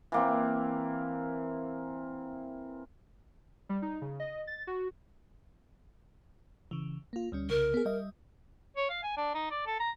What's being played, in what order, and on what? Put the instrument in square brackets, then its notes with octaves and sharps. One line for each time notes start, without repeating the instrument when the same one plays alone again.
[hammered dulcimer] E3 A#3 C4
[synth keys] G3
D#4
C#3
D#5
A6
F#4
[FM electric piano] C#3 E3
A#3 F4
D2 G3 C#4
[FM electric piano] C2 C#3 [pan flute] A#4
[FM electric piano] B3 G#4
G3 D#5 E5
[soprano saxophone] C#5
F5
G#5
D4
D#4
D5
A4
A#5